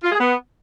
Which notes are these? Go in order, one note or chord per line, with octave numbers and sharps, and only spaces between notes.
F4
G#4
B3